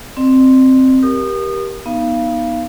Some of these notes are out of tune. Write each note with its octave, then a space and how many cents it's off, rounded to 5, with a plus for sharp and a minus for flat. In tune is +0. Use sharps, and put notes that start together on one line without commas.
C4 +0 D5 +40
G4 +0 A#4 +20 D#6 -30
B3 -25 D#4 +0 F5 -25